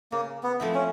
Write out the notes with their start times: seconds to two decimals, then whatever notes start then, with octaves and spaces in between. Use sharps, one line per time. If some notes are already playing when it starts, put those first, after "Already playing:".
0.12 C#3 A#3
0.43 B3
0.60 F3 A3 C4 E4
0.74 C#4